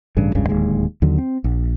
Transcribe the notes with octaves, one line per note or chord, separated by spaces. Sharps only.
A1 G2 C#3
F1 C#2 G2 C#3
D1 D#2 G#3
D#2 D3 F#3
C4
A#1